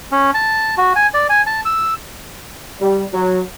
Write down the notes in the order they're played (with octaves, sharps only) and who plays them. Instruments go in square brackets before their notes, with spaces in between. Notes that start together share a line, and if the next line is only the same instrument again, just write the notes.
[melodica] C#4
A5
F#4
G#5
D5
G#5
A5
E6
[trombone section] G3
F#3